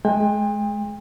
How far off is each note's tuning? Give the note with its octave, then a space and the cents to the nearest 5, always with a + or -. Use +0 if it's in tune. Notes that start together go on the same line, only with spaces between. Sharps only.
G#3 +30 G5 +40